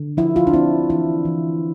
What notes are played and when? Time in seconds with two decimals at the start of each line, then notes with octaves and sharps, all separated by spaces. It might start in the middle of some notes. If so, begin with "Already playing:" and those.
Already playing: D3
0.17 F3 E4
0.36 F4
0.47 D4
0.53 C4 E4
0.90 E3 E4
1.25 E3